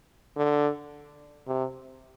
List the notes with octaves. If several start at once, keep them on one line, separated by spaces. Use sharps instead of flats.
D3
C3